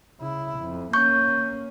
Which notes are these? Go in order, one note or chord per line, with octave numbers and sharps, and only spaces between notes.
C#3 E4
F2
A#3 C#4 C#6 G6